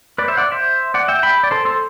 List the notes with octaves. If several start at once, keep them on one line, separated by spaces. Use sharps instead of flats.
B4 D5
C5 E5
D5 F#5
C5 E5
D5 F#5
E5 G5
G5 B5
D5
A4 C5
A4 C5